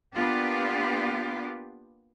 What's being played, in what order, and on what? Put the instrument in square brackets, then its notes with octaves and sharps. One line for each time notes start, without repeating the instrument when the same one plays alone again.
[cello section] A#3 B3 D4 F4 G4